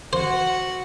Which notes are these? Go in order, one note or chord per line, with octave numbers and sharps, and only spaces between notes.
F#4 C5 F#5